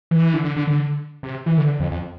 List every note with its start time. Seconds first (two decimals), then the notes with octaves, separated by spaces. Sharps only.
0.11 E3
0.34 D3
0.44 D3
0.56 D3
0.67 D3
1.23 C3
1.46 E3
1.57 D3
1.80 F2
1.91 F2